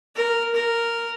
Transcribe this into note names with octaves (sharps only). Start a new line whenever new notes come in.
A#4
A#4